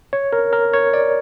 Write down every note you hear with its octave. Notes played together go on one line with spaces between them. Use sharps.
C#5
A#4
A#4
C#5
D5